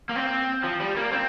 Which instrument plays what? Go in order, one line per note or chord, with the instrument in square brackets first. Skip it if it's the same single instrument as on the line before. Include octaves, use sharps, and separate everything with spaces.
[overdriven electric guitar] A#3
C4
F3
G3
A#3
C4